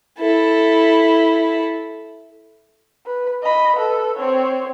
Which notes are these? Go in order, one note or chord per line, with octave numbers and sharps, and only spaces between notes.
E4 A4
B4
D#5 B5
A4 B4
C4 C#5